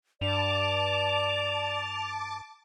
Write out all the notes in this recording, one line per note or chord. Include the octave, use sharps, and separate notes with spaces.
G2 D5 A5 D6 F7